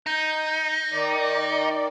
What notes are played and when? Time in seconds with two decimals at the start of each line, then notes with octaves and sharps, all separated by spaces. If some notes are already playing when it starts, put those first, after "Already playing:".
0.06 D#4 G6
0.93 D#3 D5